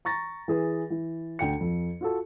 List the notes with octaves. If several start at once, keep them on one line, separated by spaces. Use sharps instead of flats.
A#5 C#6 A6 A#6
E3 G#4 B4
E3
D2 G5 C#7
F2
F4 F#4 A4